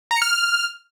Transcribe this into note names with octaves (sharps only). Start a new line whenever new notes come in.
A#5
C#7
F6